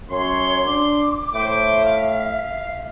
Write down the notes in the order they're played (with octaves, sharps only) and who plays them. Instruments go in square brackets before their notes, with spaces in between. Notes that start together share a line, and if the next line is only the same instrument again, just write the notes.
[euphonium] F#2 [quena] C#5 [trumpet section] C6
[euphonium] D4 [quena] D6
[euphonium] A2 [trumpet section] C5 D6 [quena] E5
[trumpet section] F5